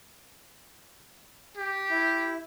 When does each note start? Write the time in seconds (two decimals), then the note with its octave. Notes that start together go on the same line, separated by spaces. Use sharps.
1.57 G4
1.90 E4